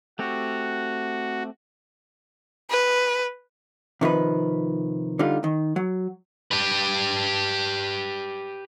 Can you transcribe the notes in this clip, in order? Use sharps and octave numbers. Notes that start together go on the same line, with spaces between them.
A3 C4 F#4 G4
B4
C3 D#3 F3 B4
D3 G3 D#4 F4
D#3
F#3
G4 B4